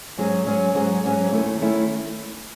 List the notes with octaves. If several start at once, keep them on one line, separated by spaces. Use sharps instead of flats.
G#2 F#3 C#4 G#4
G#2 F#3 C#4 G#4
G#2 F#3 C#4 G#4
G#2 F#3 C#4 G#4
D#2 D#3 A3 C#4 E4
D#3 A3 C#4 E4